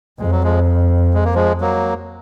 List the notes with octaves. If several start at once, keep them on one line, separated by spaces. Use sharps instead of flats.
F2 G#3
F#3
F3 G#3
G#3
A#3
F3 G#3
F#3 A#3